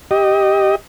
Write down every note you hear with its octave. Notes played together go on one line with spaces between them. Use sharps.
G4 D#5